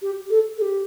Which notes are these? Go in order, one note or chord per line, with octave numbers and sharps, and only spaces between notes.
G4
A4
A4
G4